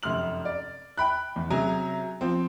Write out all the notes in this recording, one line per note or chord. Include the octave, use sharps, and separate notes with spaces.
F1 F#2 C6 F6 F#7
D5
G5 B5 F#6
E2
C3 F#3 C#4 G#4 G#5 A#5
F3 C4